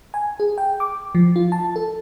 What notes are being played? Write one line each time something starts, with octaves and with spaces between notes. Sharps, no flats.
G#5
G#4
G5
D6
F3
F4
A5
A4